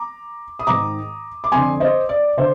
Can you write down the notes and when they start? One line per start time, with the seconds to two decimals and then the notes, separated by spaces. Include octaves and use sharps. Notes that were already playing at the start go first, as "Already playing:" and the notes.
Already playing: A#5 D6
0.59 D#6
0.67 G#2 D#3 A#5 D6
1.44 D6
1.52 F2 D3 G#5 C6
1.80 C5 D#5
2.09 D5
2.37 D3 C5